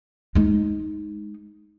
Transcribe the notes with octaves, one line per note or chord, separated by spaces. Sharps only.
G#3 D#4